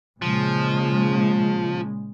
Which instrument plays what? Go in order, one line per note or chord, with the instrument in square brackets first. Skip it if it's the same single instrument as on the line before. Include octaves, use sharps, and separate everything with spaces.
[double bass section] A#2 C#3 G#3 [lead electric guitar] F3